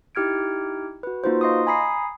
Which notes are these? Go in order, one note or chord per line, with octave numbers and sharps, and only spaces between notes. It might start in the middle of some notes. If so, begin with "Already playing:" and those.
D#4 E4 G4 F6 G#6 D7
F#4 B4
A#3 D#4 F4 F#4 B4 C5
D#5 F5 C6 C#6 D#6
G#5 A#5 B5 D#6 C7